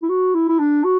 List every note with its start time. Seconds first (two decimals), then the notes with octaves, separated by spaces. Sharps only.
0.02 E4
0.09 F#4
0.34 E4
0.49 E4
0.59 D4
0.84 F#4